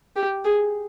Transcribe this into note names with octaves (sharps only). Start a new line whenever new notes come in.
G4
G#4